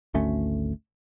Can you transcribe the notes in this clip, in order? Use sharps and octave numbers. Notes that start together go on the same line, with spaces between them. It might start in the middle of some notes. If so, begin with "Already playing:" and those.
G#1 D2 A3 C#4